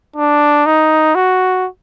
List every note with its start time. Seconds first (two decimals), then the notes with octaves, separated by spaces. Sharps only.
0.16 D4
0.66 D#4
1.15 F#4